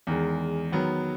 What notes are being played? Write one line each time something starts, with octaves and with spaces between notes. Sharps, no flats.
E2 D#3 G#3
D#3 F#3 B3